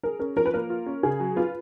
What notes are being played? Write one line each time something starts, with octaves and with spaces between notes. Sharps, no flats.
G#4 A#4
C#4 A#4
F3 A#4
B4
A#3 A#4
F4
C#4
C#3 G#4
F#3
F4 B4